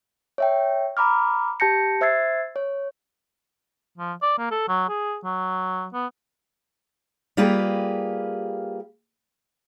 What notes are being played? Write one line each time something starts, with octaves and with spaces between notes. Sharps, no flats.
C#5 E5 G5
A#5 B5 D6 F6
G4 A5 G6 A#6 C#7
C5 E5 E6 G#6 A6 C7
C#5
F3
D5
A#3
A4
F#3
G#4
F#3
B3
G3 A#3 F4 G4 G#4 B4